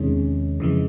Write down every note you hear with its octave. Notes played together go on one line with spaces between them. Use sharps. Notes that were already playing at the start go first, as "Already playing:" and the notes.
Already playing: E2 C3 D#3 G#3 C#4
F2 C#3 E3 G#3